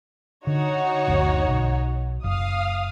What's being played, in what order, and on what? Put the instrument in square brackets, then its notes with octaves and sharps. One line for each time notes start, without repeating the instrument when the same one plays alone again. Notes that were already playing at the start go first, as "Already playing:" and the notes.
[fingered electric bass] D3 [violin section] D#4 F#4 C#5
[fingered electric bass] F#1 D2
B1
[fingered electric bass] F#1 [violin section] F5 D#6